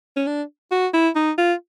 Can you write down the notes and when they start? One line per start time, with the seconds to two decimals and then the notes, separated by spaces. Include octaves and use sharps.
0.17 C#4
0.27 D4
0.72 F#4
0.93 E4
1.16 D#4
1.38 F4